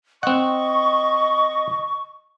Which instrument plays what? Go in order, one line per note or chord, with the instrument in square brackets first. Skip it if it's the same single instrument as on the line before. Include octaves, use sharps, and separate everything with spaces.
[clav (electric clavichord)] C4 F#5 [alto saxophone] D#5 [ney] C#6